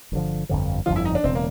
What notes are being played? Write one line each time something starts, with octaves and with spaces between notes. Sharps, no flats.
G1 F2 D3 F3
G1 F2 D3 F3
G1 F2 D3 F3 F4
E4
D#4
D4
E1 C#3 C4
A#3